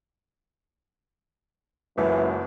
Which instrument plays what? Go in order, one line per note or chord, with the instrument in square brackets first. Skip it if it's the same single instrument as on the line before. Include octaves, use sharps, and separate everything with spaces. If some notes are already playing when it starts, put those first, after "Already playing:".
[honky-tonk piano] F#1 C#2 [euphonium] F#2 [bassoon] E3